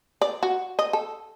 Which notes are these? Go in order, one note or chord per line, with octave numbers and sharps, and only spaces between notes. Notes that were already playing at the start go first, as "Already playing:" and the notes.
D5
F#4
D#5
A4